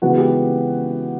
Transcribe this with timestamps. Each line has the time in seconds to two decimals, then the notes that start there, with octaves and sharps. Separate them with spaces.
0.02 C#3 E3 G#3 B3 F#4 F#5
0.18 G4 G5